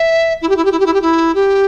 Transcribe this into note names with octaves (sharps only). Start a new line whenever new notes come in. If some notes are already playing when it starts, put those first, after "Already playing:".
Already playing: E5
E4
G4
E4
G4
E4
G4
E4
G4
E4
G4